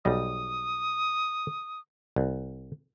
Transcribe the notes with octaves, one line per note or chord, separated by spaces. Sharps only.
B1 G3 D#5 D#6
C2